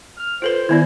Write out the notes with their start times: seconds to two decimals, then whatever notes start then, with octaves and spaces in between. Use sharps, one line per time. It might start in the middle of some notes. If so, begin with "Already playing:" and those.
0.17 F6
0.42 F4 A4 B4 C5
0.69 D#3 B3 E4 D5